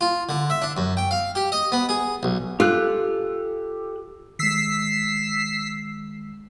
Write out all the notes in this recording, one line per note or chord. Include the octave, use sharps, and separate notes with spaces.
F4
D3
E5
D4
F#2
G5
F5
G4
D#5
B3
G#4
B1
F4 G4 A4 F#6
D#3 G#3 E6 B6 C7